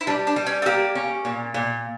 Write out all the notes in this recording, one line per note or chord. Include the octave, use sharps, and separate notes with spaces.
E4
G3 D4
D4
G3
C#4
A3
A#3 G4
C#4
A#2
A#2